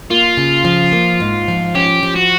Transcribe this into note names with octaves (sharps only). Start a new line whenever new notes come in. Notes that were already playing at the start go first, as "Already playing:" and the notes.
A#3 F4
C#3
F3
A#3
G#2
F3
C#4 G4
F3
F#4